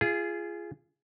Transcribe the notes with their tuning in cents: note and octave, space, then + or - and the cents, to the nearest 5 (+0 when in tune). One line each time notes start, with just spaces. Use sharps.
F4 -25 G#4 +0